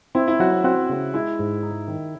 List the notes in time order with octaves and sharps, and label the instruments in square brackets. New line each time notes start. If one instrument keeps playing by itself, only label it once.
[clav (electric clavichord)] C4 [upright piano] E4
[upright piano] E4
[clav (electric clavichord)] F#3 [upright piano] F#4
[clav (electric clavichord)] C4 [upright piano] F#4
[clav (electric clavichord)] C#3
[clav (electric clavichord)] G#3 [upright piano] E4
[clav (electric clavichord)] G#2
D#4
D#3